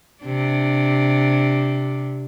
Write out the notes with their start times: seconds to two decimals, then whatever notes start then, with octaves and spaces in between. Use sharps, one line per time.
0.24 C3 D4